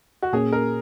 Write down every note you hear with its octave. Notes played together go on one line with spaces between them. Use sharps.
F#4
A#2 A#3 C#4 G#4
A#4